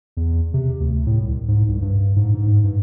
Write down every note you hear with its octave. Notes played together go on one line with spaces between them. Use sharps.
E2
C3
D2
A2
C2
G#2
C2
G2
G#2
G#2
G#2
G2